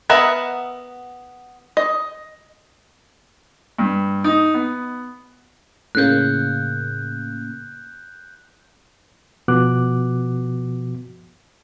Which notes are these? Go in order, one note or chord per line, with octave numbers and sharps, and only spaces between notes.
B3 A#4 D#5 E5 F#5
D#5
G2
D#4
B3
A2 C#3 A#3 F#6 G6
B2 F3 B3 F#4 D6 F#6